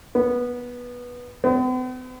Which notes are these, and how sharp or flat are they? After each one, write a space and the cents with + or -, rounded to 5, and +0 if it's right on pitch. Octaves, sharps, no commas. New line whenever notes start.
B3 -15
B3 +45